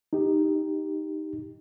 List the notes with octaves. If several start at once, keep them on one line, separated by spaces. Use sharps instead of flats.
D#4 G4